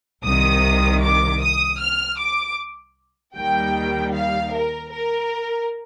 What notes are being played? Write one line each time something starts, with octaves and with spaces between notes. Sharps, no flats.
C2 C3 D#3 D#6
D6
D#6
F6
D6
D#2 D#3 G3 G5
F5
A#4
A#4